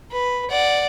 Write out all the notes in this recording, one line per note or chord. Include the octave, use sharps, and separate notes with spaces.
B4
D5 F#5